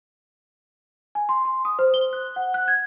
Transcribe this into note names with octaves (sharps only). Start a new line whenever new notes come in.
G#5
C6
C6
D#6
C5
G7
F#6
F#5
F#6
G#6